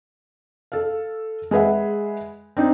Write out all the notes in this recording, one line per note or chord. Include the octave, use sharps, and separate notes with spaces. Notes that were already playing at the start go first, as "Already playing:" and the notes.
A4 F5
G#3 G#4 B4 E5 F#5
C4 D4 D#4